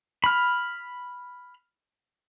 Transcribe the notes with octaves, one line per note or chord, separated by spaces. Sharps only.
B5 F6